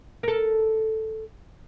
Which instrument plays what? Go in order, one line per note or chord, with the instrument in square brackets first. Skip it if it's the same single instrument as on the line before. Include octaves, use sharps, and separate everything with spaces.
[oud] A4 A#4